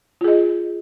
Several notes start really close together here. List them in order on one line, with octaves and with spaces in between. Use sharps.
F4 G#4 D#5